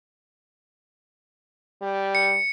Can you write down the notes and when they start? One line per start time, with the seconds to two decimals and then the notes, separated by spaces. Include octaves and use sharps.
1.82 G3
2.15 C#7